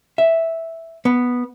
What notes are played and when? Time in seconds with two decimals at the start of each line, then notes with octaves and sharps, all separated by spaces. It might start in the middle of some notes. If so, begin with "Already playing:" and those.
0.18 E5
1.05 B3